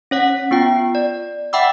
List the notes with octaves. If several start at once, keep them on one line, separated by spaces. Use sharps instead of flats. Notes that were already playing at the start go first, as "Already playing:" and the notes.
C#4 C#5 F#5
B3 F4 G5
D5
E5 F#5 G5 B5 D6 E6